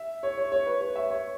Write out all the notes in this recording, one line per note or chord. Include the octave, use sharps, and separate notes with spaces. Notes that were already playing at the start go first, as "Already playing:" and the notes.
Already playing: E5
C#5
C#5
C#5
B4
C#5
E5
C#5